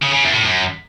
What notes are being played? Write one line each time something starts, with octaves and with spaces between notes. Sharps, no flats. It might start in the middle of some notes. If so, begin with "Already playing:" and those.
C#3
C#3
E2
A2
F#2